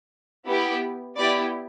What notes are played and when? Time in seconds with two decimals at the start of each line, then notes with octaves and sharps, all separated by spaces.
0.47 B3 E4 G4
1.17 B3 E4 G4 D5